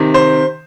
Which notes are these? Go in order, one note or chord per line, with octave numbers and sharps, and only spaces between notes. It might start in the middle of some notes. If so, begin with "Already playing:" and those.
Already playing: C3 D#3
C5